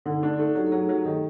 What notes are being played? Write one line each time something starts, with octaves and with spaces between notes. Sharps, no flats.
D3 D#4
A3 D4
A3 D#4
F#3 G4
A4
F#3 G#4
F#3
D#3 A4